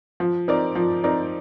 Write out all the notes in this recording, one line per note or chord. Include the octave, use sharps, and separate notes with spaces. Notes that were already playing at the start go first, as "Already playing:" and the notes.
F3
C4 D#4 A#4 D5
F3
C4 D#4 A#4 D5